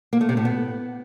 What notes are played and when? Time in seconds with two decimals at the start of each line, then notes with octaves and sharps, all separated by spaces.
0.13 A#3
0.21 A3
0.29 C3
0.37 A2
0.45 B3